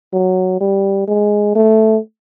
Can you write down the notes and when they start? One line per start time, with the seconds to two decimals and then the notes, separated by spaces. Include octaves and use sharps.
0.13 F#3
0.61 G3
1.08 G#3
1.55 A3